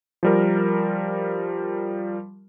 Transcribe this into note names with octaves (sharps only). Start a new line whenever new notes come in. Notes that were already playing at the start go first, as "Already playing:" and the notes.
F3 G3 A#4